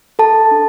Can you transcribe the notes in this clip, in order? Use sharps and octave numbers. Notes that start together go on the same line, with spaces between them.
A4 A5
D4